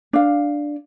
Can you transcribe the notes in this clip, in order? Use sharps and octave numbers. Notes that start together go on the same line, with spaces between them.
D4 F5